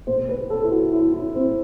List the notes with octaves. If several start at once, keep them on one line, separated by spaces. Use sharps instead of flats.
B2 C5
B4
A4
E4
F#4
E4
E4
C4